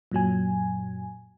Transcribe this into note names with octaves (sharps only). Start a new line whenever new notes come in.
F#2 A#2 F#3 G#5